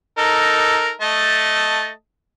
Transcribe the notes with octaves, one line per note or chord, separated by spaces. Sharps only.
D#4 A4 A#4
A3 D#5 A5